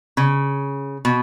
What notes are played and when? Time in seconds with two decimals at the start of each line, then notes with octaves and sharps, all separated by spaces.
0.17 C#3
1.05 B2